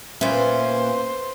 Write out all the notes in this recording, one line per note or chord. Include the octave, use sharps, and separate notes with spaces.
A#2 B3 C#4 B4 C5 E5